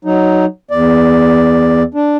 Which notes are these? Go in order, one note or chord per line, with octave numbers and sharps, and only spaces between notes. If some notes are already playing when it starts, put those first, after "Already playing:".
F#3 D#4
E2 D5
D4